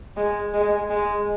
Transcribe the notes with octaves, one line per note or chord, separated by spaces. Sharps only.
G#3
G#3
G#3